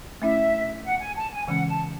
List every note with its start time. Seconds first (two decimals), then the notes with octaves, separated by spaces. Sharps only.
0.22 A3 C#4 E4 E5
0.85 F#5
1.00 G#5
1.16 A5
1.32 G#5
1.48 C#3 E3 G#3 C#4 F#5
1.68 A5